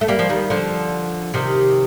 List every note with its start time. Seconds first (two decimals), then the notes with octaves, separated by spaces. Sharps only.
0.01 A3
0.08 G3 A#3
0.19 F3
0.29 D#3 G3
0.50 D3 F3
1.34 C3 D#3